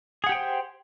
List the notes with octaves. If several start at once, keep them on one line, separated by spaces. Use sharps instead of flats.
G4 G#4 C5 F#5 G5